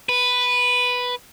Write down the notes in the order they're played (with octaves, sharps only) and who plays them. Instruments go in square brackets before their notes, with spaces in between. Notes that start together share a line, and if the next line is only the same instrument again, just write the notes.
[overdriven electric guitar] B4